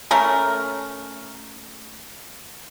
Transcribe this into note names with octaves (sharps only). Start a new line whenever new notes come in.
A3 C#4 A#4